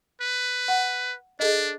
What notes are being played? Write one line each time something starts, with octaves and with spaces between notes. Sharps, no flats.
B4
F#5
D4 G#4 A4 D#5